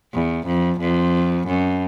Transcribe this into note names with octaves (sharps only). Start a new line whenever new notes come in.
E2
F2
F2
F#2